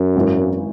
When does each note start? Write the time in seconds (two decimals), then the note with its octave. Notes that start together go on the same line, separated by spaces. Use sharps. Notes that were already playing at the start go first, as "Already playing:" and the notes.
Already playing: F#2
0.16 G#1 G#2 E3